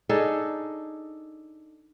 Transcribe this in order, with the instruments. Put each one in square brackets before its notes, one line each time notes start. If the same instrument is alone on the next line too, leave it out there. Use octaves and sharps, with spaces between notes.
[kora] D4 D#4 G#4 A4